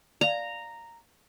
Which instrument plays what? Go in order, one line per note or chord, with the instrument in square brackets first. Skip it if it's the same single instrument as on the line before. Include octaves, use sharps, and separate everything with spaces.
[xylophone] D5 F5 [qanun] A#5